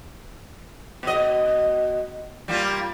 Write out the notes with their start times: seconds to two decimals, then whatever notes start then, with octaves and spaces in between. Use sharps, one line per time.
1.03 B2 D#5
2.48 G3 A#3 F4